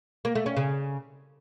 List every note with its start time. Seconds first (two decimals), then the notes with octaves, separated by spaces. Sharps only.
0.25 A#3
0.35 A3
0.46 C#4
0.57 C#3